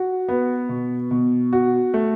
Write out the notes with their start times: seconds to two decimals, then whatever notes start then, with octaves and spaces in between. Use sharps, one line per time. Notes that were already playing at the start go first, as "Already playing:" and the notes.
Already playing: F#4
0.29 B3
0.69 B2
1.11 B2
1.53 F#4
1.94 A3